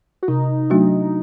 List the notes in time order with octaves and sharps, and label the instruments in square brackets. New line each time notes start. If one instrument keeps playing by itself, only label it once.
[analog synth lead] F#4
[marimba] C3 [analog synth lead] D#4
[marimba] F#3 A3 D4 F#4